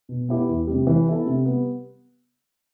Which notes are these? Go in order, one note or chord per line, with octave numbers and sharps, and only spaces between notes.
B2
B3 E4 G4
E2
C3 G3
E3
B3 E4 A4
C3
G3 B3